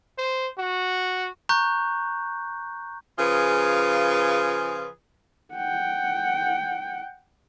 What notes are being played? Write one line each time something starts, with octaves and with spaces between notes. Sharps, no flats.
C5
F#4
A#5 C#6 F#6 G6
C#3 F3 F4 G#4 B4
F#5 G5